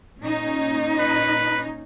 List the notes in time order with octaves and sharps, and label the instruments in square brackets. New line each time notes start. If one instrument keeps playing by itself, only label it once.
[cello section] A#2 C#4 D#4
[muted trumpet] B4